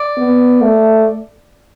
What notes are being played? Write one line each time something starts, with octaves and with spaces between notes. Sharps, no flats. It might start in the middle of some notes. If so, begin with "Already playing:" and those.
Already playing: D5
B3
A3